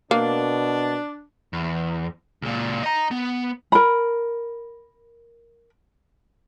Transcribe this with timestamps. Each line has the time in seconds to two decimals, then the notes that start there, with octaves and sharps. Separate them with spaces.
0.11 B2 A#3 D4
1.53 E2
2.42 C#2 A#2
2.83 D#5 A#5
3.11 B3
3.72 A#4 B5